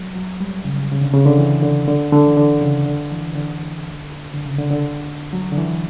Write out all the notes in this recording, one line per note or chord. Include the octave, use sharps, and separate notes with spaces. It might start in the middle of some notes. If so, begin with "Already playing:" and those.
Already playing: F#3
F#3
G3
C#3
C#3
D3
C#3
D3
E3
D3
D3
D3
E3
D3
C#3
D3
E3
D3
D3
C#3
D3
D3
F#3
D3
E3